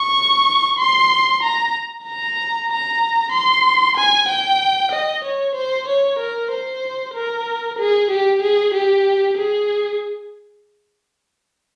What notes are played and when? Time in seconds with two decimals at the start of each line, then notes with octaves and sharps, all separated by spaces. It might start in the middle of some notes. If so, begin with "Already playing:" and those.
Already playing: C#6
0.79 C6
1.43 A#5
2.06 A#5
2.70 A#5
3.33 C6
3.97 G#5
4.28 G5
4.92 D#5
5.24 C#5
5.55 C5
5.88 C#5
6.19 A#4
6.51 C5
7.15 A#4
7.79 G#4
8.11 G4
8.42 G#4
8.74 G4
9.37 G#4